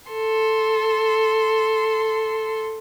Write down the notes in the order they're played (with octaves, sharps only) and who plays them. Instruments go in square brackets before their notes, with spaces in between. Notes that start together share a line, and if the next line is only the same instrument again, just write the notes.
[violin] A4 C6